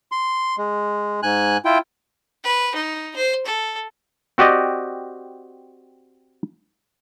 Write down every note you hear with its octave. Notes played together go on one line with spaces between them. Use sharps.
C6
G#3
G#2 G#5 F#6
E4 F4 G5
B4
D#4
C5
A4
C4 F#4 G4 D5 D#5